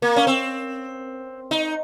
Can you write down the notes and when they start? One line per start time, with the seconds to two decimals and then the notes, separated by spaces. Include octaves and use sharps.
0.02 A#3
0.16 C#4
0.27 C4
1.51 D#4